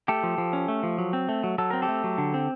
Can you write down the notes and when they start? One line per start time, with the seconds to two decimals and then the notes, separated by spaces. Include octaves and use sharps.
0.08 A3 G4 A4
0.23 F3
0.38 F3
0.53 C#4
0.68 A3
0.83 F3
0.98 F#3
1.13 C4
1.29 A3
1.44 F#3
1.58 F#3 A4
1.71 C4 A#4
1.82 G4 A4
1.88 A3
2.04 F#3
2.18 D3
2.34 C4